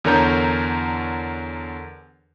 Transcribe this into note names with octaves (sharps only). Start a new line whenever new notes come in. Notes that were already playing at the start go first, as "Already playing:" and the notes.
E2 D3 A#4 C#5 A#5 G6